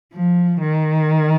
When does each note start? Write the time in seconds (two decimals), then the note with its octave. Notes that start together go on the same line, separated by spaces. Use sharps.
0.13 F3
0.61 D#3